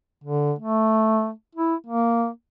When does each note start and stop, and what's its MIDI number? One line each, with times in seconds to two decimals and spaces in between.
0.24 0.53 50
0.59 1.31 57
1.55 1.75 64
1.87 2.29 58